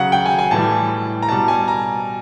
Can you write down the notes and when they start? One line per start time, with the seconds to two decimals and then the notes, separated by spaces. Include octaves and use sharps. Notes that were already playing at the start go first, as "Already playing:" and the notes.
Already playing: C#3 F#3 F5 F#5
0.12 G5
0.26 G#5
0.39 G#5
0.51 A2 E3 G3 A5
1.23 A#5
1.29 B2 G3 A5
1.48 G#5
1.68 A#5